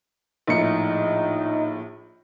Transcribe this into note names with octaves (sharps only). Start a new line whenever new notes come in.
A#1 A2 D#4 C#7